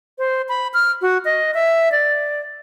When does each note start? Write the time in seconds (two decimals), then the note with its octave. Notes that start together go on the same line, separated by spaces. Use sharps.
0.18 C5
0.49 B5
0.74 F6
1.02 F#4
1.25 D#5
1.54 E5
1.92 D5